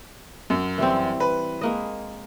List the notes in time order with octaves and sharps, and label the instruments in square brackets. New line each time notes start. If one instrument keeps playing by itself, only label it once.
[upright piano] F#2
[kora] E3 G3 C4
[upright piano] B4
[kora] G#3 A#3 D#5